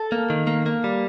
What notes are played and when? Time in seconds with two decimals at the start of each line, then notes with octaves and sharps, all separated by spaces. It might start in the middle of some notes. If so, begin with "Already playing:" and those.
Already playing: A4
0.12 A#3
0.30 D#3
0.47 A#3
0.66 A#3
0.84 G3